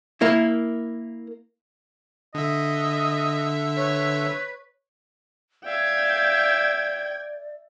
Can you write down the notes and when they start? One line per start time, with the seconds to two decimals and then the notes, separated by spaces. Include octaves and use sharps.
0.21 A#3 E4
2.34 D3 D#5 E5
3.77 B4 C#5
5.65 D5 E5 F5 G5 G#6